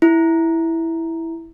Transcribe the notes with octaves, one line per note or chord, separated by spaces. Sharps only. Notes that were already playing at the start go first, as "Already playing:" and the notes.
E4